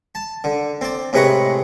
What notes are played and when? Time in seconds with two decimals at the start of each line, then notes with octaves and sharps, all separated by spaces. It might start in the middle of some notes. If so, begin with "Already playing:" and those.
0.15 A5
0.44 D3
0.81 C4 D5
1.13 A2 C3 G#3 B4 A#5 C#6